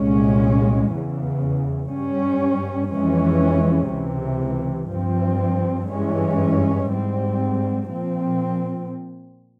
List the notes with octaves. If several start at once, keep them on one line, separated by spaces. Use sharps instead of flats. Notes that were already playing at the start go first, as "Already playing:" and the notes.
Already playing: C2 A#2 G#3 C#4
E2 C#3 E3
G2 G3 C#4
F2 E3 G#3 C#4
C#2 C3 E3
G2 F3 C4
G2 E3 G#3 C#4
G#2 G3 C4
A#2 F3 C4